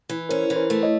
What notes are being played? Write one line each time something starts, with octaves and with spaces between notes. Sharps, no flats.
E3
C#4 A#4 C5
E3
A#4 C5
A3
C#5 D#5